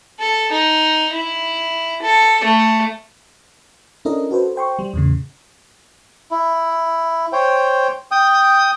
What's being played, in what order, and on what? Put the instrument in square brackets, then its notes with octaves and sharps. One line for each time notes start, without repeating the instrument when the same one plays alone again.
[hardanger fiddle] A4
D#4
E4
A4
A3
[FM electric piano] C#4 D4 E4 A4 A#4 D#5
F#4 A4 B4 C5
C5 G5 C6 C#6
G3
E2 A2 C#3
[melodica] E4
C5 C#5 G5
G5 D#6